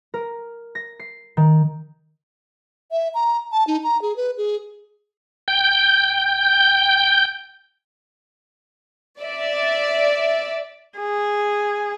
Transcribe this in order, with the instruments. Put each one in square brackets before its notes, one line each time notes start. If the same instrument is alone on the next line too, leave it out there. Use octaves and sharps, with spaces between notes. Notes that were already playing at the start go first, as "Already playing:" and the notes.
[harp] A#4
A#6
C7
D#3
[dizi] E5
A#5
A5
D#4
A#5
G#4
B4
G#4
[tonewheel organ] G5 G6
[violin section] D5 E5
[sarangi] G#4